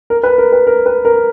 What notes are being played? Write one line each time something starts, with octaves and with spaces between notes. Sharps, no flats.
A#4
B4
A#4
B4
A#4
B4
A#4